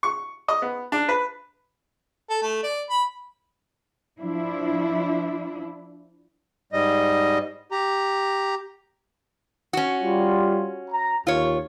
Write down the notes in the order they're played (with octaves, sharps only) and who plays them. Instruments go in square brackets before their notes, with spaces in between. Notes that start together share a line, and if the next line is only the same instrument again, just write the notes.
[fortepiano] C#6
D#5
B3
D4
B4
[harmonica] A4
A3
D5
B5
[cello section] F3 D4 E4
[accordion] G#2 G3 D#5
G4 A#5
[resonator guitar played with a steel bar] C#4 F#4
[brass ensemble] G3 F4
A#5
[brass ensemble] D#2 [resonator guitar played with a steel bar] F4 C#5